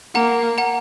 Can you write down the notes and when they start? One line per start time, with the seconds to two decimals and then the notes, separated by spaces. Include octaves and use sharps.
0.15 A#3 F#5 A#5
0.58 F#5 A#5